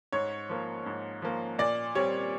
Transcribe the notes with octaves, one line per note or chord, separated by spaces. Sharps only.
G#2 C#5
F3 A#3
G#2
F3 A#3
A#2 D5
G3 C4 C#5